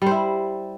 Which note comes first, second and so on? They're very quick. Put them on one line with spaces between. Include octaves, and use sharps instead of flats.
G3 C5 E4